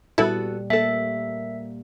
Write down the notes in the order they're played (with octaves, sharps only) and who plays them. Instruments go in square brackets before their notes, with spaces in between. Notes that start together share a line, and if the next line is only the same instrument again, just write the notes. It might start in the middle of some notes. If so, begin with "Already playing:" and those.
[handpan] A#2 G3 [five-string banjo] B3 F#4 A4 [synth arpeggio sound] E4
[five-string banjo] A3 A4 [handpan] A#3 [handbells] E5